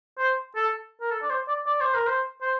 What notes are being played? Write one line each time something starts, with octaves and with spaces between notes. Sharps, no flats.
C5
A4
A#4
A4
D5
C5
D5
D5
C5
A#4
C5
C5